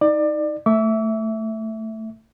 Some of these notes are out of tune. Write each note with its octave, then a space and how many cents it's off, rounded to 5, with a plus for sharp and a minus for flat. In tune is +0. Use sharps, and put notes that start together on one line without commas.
D#4 +20 D5 +25
A3 +10 E5 -5 D6 -45